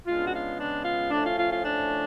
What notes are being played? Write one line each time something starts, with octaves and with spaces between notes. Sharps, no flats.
C#3 G#3 B3 D4 F4
F#4
F4
D4
F4
A2 F3 A3 C#4 D4
F4
F4
F4
D4